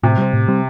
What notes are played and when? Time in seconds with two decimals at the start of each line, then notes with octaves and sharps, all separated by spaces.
0.03 A2 C3
0.18 G3 C4
0.33 A2
0.48 G3 C4